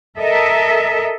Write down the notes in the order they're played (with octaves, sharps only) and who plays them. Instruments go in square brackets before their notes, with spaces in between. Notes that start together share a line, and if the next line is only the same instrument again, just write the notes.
[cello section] A4 A#4 D#5 E5